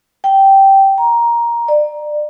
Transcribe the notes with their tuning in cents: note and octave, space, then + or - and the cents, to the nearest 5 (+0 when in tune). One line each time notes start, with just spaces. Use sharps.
G5 -10
A#5 +10
D5 +30